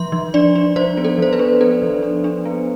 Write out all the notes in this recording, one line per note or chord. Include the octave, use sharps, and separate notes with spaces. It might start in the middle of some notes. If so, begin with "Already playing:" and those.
Already playing: F3 C6
F3
D4 D5
D4
F3 C5
B3
A4
F3 C5
B4
D4
B3 A4
F3
D4
D4
B3